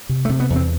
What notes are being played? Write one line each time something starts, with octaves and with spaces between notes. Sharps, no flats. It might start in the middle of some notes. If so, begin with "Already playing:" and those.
C3
A3
C3
B3
E2
C4